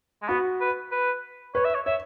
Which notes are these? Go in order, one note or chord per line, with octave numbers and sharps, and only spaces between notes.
G#3
B3 F#4
B4
B4
B4 C#5
E5
C#5
C#5 E5